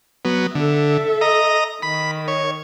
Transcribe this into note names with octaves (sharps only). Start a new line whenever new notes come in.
F#3 B3
D3 A4 E5
D#5 A#5
D#3 B5
C#5